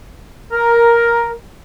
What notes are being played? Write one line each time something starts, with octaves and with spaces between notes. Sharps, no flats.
A#4